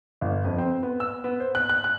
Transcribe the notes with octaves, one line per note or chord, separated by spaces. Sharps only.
G1
F2
C4
B3
E6
B3
C5
F#6
F#6
F#6